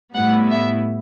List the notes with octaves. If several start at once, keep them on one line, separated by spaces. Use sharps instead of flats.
A2 G3 B3 E4 F#5
E5